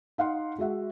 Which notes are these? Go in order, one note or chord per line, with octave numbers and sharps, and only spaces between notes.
D#4 F5 F#5 C6
G#3 F#4 E5 F#5